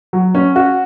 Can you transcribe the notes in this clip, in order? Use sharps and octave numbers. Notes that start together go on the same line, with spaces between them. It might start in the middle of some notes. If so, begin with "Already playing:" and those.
F#3
C#4
F#4